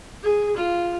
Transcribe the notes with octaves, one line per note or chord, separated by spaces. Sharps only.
G#4
F4